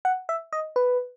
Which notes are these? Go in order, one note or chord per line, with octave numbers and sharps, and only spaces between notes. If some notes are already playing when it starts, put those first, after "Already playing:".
F#5
E5
D#5
B4